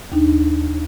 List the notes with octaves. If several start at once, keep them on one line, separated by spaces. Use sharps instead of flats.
D#2 D4 D#4